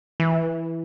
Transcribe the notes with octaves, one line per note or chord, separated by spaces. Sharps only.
E3